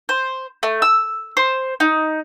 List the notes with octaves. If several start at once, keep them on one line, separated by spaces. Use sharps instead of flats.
C5
A3
E6
C5
D#4